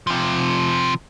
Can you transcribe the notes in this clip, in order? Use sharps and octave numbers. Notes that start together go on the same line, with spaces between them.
C3 F3